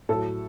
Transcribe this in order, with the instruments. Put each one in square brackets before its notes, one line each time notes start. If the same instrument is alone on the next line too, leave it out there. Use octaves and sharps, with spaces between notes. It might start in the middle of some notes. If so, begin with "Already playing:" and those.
[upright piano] A2 F#3 A4